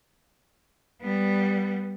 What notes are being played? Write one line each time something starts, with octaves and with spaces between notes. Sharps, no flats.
G3 B3